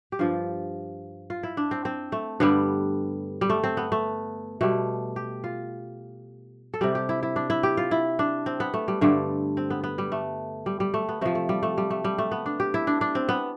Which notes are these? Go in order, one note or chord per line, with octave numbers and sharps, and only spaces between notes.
G4
G2 F3 F4
F4
E4
D4
C4
C4
A3
G2 D3 G3 B3
G3
A3
C4
B3
A3
B2 G3 A3
G4
F4
A4
C3 G3 G4
G4
E4
E4
D4
E4
G4
F4
E4
D4
C4
B3
A3
G3
G2 D3 G3 A3
C4
B3
B3
G3
A3
G3
G3
A3
B3
C3 F3 A3
A3
G3
A3
G3
A3
G3
A3
B3
D4
G4
E4
D4
D4
C4
B3